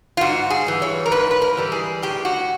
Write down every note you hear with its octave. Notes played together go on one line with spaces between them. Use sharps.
F4
G#2 F#4
G#4
E3 G3
C#5
A#4
G#2 B4
B4
A#4
E3 G3
G#4
A2 G4
F#4